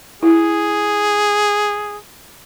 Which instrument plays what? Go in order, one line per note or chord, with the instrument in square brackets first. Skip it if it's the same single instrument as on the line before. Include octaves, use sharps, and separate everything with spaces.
[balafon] E4 [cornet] G#4